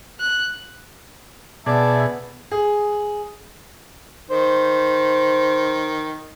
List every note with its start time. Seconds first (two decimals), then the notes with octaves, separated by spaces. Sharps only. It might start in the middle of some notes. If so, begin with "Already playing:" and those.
0.20 F#6
1.66 B2 B3 G#4 D5 E5 A5
2.51 G#4
4.31 D#3 C5